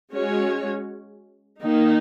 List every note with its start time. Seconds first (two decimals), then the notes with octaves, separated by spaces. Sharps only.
0.14 G#3 C#4 F#4 C#5
1.63 D#3 A#3 D#4